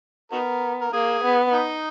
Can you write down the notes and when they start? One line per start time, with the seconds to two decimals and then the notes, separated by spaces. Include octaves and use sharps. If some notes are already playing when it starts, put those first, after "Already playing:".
0.32 B3 D#4 F#4 A#4
0.81 A#4
0.93 A#3 G#4
1.24 B3
1.53 D#4